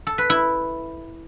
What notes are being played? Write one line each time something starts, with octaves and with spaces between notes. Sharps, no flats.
A4
B4
E4